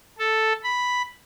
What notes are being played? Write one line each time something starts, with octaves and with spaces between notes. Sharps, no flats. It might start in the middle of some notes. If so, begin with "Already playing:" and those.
A4
B5